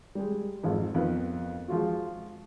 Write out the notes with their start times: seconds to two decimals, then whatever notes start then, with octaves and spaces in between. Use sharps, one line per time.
0.15 G3 G#3
0.63 G#1 F2 G#2
0.95 F2 D#3 B3 B4
1.68 F3 G#3 F4 F#4